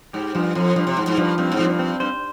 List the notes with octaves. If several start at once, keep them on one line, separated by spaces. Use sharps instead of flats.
G#2 G4
G2 F3
F2 F3
G2 F3
C3
G#2 F3
G#2
G2 F3
G2 C4
G#2
F3
G2
C4
G2 C5